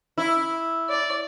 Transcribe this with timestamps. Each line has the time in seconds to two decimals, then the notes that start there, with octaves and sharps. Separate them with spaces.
0.18 E4
0.89 D5